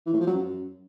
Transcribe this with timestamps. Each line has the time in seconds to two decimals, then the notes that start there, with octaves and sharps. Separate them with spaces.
0.06 E3
0.13 A2
0.20 F3
0.27 F#3
0.34 F#2